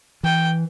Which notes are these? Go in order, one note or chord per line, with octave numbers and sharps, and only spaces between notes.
E3 G5